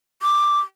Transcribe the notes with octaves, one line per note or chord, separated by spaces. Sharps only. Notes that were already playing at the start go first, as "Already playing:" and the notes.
D6